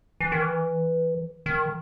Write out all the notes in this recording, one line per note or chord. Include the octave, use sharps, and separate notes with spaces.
E3
D#3
E3
D#3